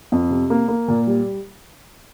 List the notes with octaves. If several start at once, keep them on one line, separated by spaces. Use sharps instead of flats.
F2
C3
A#3
A#3
A#2
G3